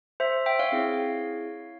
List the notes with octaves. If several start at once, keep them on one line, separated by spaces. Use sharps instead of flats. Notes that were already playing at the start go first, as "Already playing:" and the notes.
C5 E5
E5 G5
C#5 F5
C4 E4 G#4